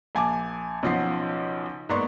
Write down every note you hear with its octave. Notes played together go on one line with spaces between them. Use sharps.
A#1 G#5 A5 D6
B1 C#3 F3 F#5 C6 C7
G#2 A#3 B3 D5 C6 C#6